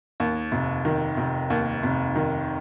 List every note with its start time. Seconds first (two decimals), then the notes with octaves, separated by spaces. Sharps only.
0.20 D#2
0.52 F1
0.85 D#3
1.17 F1
1.50 D#2
1.83 F1
2.15 D#3